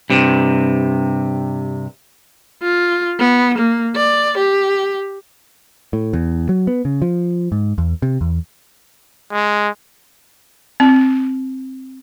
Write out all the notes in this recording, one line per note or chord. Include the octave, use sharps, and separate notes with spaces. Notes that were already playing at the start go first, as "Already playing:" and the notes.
G2 C3
F4
B3
A#3
D5
G4
A2
E2
F#3
B3
C#3
F3
G#2
E2
C3
E2
G#3
C4